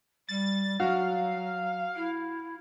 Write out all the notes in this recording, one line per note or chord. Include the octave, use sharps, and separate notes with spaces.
G3 A6
F#3 F#4 F5
E4